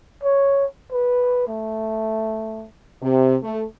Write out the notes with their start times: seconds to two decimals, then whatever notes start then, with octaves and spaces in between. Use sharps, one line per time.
0.23 C#5
0.92 B4
1.48 A3
3.02 C3
3.42 A3